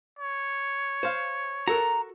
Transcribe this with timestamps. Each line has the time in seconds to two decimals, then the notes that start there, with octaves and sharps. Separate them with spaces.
0.19 C#5
1.03 C5 F5
1.68 F#4 A4 A#4 A#5